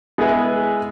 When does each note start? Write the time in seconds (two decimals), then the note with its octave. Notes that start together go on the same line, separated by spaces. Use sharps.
0.18 G#3 B3 E4 G#4 B4